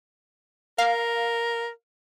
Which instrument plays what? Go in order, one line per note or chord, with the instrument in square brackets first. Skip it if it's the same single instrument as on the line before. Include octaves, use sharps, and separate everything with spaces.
[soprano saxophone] A#4 [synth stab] F5